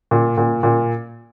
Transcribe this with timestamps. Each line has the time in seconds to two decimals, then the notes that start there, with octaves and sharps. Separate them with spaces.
0.11 A#2
0.38 A#2
0.63 A#2